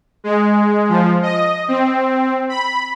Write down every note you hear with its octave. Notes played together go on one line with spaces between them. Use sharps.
G#3
F3
D#5
C4
B5